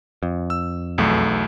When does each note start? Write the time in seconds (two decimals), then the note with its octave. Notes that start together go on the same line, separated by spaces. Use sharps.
0.23 F2
0.50 E6
0.98 B1 E2 A3